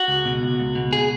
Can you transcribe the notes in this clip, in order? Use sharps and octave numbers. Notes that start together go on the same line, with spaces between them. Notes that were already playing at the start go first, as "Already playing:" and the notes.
Already playing: F#4
C#2
B2
C#2
C#2
B2
G#4